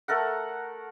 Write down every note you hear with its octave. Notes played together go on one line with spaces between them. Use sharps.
A3 A4 A#4 F#5